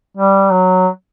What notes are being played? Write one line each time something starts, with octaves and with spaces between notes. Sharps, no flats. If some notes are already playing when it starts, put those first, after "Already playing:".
G3
F#3